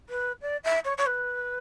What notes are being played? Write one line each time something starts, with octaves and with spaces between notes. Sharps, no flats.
B4
D5
E5
C#5
C#5
B4